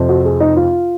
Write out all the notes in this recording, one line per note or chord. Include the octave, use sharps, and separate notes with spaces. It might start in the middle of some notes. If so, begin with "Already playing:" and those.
Already playing: F2 C3 F3 C4
F#4
G#4
D#4
F4